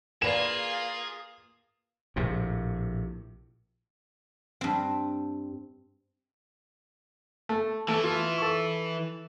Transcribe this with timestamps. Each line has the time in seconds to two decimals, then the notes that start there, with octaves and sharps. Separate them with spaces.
0.22 A#3 F4 G#4 A#4 B4 D5 E7
2.16 A#1 A2 C3
4.61 G2 C4
7.49 A3
7.88 E3 A3
8.04 F4
8.38 A4 C#6